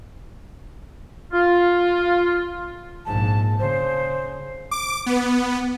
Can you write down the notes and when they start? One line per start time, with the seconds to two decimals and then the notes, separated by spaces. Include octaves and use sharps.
1.33 F4
3.06 A#1 G#2 A5
3.60 C#3 C5
4.71 D6
5.06 B3